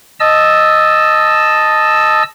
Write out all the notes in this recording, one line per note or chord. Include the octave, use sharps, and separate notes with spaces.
D#5 A5 E6